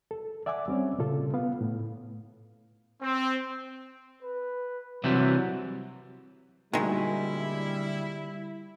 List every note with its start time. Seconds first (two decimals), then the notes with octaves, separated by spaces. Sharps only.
0.11 A4
0.46 D5 E5 F#5 G#5 D6
0.68 G3 C4 C#4 C#5
0.99 A#2 C#3 F4 A4
1.34 B3 F5
1.61 A2
3.01 C4
4.23 B4
5.04 C3 E3 F#3 G3
6.73 D2 A#2 D#3 G3 G#3 E4